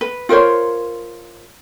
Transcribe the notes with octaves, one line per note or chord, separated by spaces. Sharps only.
B4
F4 A#4 C5 C#5